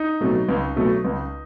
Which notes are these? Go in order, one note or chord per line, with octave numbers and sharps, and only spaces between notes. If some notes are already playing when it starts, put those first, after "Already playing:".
Already playing: D#4
B2 F#3 A3
C#2
B2 F#3 A3
C#2